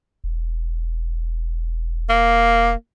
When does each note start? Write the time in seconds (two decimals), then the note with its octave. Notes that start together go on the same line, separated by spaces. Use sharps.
0.24 E1
2.10 A#3